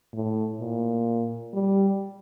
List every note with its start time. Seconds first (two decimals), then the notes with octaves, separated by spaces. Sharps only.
0.13 A2
0.60 A#2
1.54 G3